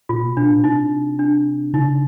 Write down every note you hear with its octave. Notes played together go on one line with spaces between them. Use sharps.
A#2 F4
B2
B2 D4
A#2
C3 D#4
D4
C#3 D#4